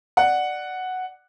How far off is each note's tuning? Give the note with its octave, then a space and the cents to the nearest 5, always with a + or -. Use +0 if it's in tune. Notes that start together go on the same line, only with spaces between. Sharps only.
D5 +15 F#5 +0